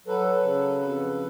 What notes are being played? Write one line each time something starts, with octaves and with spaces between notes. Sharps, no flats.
F#3 A4 B4
C#3
F2